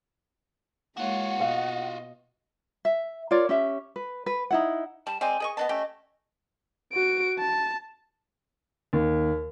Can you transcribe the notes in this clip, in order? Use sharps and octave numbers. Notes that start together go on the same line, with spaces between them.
G#3 A#3 F4 F#4 C#5 F#5
B2 D#5 F5
E5
F4 A#4 C#5 D5
C#4 G4 E5
B4
B4
D#4 E4 F#5
G3 A5
G#3 C4 D5 G#5
G#4 D#5 C#6
B3 D4 D#5 A5
A3 C#4 G4
F#4 D7
A5
D#2